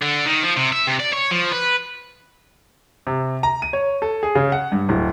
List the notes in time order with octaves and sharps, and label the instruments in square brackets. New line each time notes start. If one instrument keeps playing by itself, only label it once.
[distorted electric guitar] D3
D#3
F3
C3
E5
C3
D5
C#5
F3
B4
[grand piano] C3
A#5
D#7
C#5
A4
G#4
C#3
F#5
G2
D1